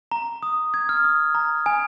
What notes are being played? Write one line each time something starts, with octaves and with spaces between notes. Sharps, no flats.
A#5
D#6
G#6
F6
D#6
A#5
G#5